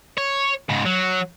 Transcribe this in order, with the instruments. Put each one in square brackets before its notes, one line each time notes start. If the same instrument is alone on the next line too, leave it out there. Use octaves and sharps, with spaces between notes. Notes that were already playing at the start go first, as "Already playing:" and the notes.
[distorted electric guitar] C#5
G#2 C#3
F#3